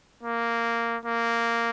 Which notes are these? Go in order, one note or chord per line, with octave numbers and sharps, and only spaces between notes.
A#3
A#3